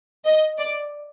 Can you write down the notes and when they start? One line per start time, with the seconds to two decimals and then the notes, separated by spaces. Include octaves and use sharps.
0.25 D#5
0.59 D5